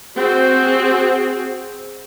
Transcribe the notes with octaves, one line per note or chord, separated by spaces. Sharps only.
C4 F#4 G#4